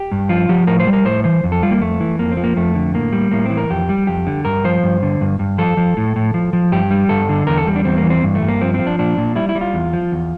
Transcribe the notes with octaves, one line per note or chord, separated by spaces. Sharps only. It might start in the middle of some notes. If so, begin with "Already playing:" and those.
Already playing: G4
G2
F3 F4
F3 G4
A2 A#4
C5
G3
A#4
A2 C5
E3 C5
F2
A4
G3 F4
A#3
F2 A3
E3
F2 A#3
C4
F3
A#3
F2 A3
D3
A2 A#3
G3
A2 A#3
C4
E3
A#4
F2 G4
G3
F2 G4
D3
G2 A#4
F3 C5
G2
D3
G2
G2
F3 A4
F3
A2
A2
F3
F3
G2 G4
G3
G2 A4
D3
E2 A#4
A4
G3
D4
E2 C4
A#3
E3
C4
G2
A3
G2
A#3
F3 C4
C4
F3
D4
A#2 D4
A#2
G3 E4
E4
G3
F4
E2
F3
E2